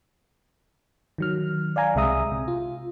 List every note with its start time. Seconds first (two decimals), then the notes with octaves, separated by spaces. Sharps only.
1.18 D#3 F#3 F6
1.76 D5 F5 G#5 A#5
1.95 C2 C3 G#3 E5 A#5 D#6
2.32 C3
2.48 F4